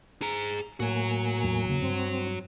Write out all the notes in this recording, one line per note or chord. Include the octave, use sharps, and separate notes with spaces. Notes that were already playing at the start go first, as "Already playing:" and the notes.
G#4 A#5
A2 A#3 F#4 C#5 G#5
E2 F#3
C#3 A#3
G2 C4